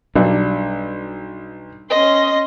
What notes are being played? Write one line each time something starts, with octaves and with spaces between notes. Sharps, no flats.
B1 G3 D4
C#4 D#5 C6